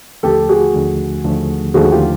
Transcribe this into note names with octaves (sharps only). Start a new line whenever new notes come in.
D#2 D3 F3 A3 G4 A4
F#4 G#4
D#2 D3 F3 A3
D#2 D3 F3 A3
D#2 D3 F3 A3 F#4 G#4
F4 G4